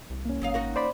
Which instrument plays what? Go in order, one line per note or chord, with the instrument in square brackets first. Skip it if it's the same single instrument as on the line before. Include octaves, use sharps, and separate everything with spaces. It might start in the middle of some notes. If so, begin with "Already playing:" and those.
[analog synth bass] C2
[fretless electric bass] A#3 C#4
[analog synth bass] G#1 [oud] F#3 D#5 F5
[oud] D#4 F#4 A#4
[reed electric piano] C5 D5 B5